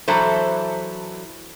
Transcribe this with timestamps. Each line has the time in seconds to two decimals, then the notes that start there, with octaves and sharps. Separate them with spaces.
0.08 E3 F#3 D4 E4 A4 C5